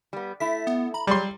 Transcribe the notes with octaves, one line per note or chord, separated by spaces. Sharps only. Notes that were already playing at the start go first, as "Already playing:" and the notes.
G3 B3
A3 E4 B6
B3
A#5 B5
F#3 G3 C6